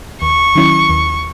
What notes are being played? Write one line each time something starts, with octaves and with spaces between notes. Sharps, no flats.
D#2 C#6
D#3 F#3 C#4 E4
D#2